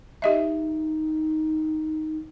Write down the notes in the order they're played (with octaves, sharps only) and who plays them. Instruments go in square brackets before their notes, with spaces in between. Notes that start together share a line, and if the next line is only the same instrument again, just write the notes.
[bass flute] D#4 [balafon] G4 D#5 E5